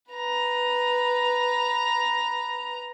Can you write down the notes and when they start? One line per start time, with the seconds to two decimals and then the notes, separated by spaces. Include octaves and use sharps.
0.11 B4 A#5